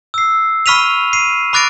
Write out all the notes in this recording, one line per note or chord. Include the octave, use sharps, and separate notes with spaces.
E6 C7
B5 C#6 F6 B6 D#7 F7
C7 D#7
B5 D6 F#6 A6 A#6 D7